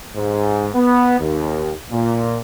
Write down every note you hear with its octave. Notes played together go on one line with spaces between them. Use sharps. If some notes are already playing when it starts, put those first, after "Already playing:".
G#2
B3
D#2
A#2